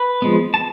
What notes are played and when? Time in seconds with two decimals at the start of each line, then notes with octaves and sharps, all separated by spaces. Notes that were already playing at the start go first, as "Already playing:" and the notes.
Already playing: B4 B5
0.22 F3 G#3 B3
0.54 A5